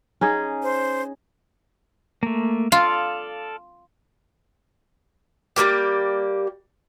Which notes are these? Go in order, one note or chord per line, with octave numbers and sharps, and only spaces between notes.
C#4 D#4 G#4
C5
A3 A#3
F4 A4 D5 F5
G3 G#3 A#3 G4